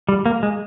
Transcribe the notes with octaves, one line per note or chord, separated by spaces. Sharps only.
G3
A#3
G#3